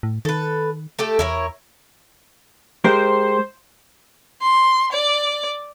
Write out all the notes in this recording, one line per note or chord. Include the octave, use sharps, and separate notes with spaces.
A2
D#3 A4 B4
A3 G4 A4
E2 E4 A#4 C#5
G#3 G4 A#4 C5
C6
D5